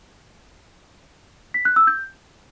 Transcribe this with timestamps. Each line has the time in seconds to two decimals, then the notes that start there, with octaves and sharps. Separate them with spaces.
1.54 B6
1.65 F#6
1.76 E6
1.87 G6